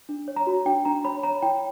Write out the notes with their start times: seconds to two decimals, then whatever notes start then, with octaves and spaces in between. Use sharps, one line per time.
0.09 D4
0.28 C#5
0.36 A#5
0.47 F#4
0.65 D4 G5
0.85 D4 A#5
1.04 C#5 B5
1.23 C#5 A#5
1.42 E4 G5